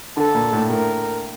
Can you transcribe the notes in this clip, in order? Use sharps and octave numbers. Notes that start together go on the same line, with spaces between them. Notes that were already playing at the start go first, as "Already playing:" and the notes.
D3 A4
A#2
A2
A2 A#4